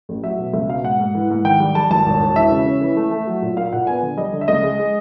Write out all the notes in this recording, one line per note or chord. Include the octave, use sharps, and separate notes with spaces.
A1
F#3 E5
B2
C#2 E5
B2 F5
G#2 F#5
G#2
E3
G#2
D#3 G5
G3
G3 A5
G#1 A5
E1
E1
E3 E5
C#3
C#4
E3
A3
A3
F#3
A#2
A#3 F5
A#2 F#5
B3 G#5
D3
G3 D#5
D3
E5
C#2 D#5
G#3
G#3